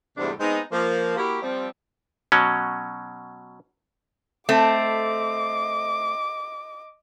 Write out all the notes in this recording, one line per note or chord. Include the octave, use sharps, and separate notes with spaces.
E2 G#2 C3 G3 A3 D4
G#3 B3 C4 D#4
F3 A#3
A#3 E4 F#4 G4
F3 G3 C4
B2 F#3 C#4
A3 C4 D#5 D6